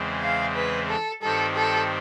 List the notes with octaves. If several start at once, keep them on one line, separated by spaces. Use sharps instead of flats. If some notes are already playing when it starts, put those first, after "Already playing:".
Already playing: E2 C#3 E3 G#3 C4
F5
B4
A4
G2 D#3 G3 C4 A4
A4